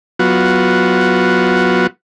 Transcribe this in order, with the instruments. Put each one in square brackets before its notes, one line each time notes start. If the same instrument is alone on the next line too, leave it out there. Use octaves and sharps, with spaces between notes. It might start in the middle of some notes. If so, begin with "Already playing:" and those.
[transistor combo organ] F#3 B3 F4 F#4